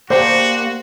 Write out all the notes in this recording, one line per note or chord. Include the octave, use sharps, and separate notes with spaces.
A#3 D4 F#4 G4 C5 G5